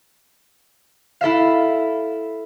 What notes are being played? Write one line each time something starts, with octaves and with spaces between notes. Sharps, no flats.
E4 A4 E5 F5